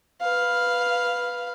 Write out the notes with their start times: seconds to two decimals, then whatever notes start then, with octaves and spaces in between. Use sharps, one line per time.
0.21 B4 F5